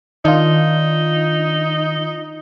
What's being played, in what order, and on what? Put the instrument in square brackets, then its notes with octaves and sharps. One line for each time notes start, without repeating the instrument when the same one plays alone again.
[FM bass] D#3 [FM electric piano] D4 F4 [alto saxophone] D#4